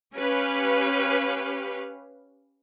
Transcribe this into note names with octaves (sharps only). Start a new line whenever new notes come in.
C#4 G4 B4 F5